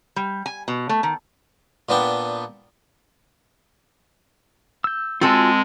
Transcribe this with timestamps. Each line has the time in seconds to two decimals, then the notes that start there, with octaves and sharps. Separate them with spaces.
0.16 G3
0.46 G#5
0.68 B2
0.89 A3
1.03 D#3
1.89 A#2 B3 D4 G5
4.84 E6 G6
5.21 G#3 C4 F4 F#4 A4 G#5